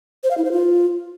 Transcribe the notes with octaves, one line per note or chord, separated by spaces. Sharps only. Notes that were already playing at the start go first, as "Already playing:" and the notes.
C5
F5
E4
C5
F4